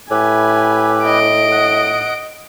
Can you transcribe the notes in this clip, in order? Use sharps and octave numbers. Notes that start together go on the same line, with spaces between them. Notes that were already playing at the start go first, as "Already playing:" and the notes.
A2 E4 G4 B4 G#5
D#5 D7
F#5 D#6